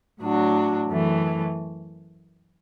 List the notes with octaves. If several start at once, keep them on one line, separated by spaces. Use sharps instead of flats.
A2 F#3 D4 F#4
F#2 E3 A3